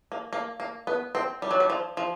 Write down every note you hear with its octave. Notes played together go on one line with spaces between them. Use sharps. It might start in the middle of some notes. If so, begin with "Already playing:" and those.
A#3
A#3
A#3
B3
C4
G3
F#3
G3
F3
F3